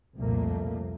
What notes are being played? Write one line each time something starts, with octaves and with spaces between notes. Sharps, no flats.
C2 F2 A#2 A3 A#3